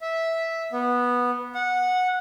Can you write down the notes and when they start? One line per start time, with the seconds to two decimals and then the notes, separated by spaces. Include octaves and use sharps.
0.01 E5
0.72 B3
1.55 F#5